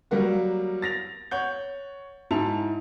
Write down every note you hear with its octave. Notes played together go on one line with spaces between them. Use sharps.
F#3 G3 A#3 F#4
A6 A#6 F7
C#5 F#5 G6
G#2 E4 A5 F7